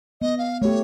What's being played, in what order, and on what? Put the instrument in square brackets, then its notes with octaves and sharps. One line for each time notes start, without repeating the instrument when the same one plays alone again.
[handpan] B3 [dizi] D#5
[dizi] F5
[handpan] A3 G4 [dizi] C#5